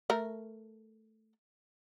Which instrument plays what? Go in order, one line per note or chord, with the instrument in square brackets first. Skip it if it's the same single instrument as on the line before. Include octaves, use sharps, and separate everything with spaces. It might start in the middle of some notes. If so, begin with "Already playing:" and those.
[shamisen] A3 A#4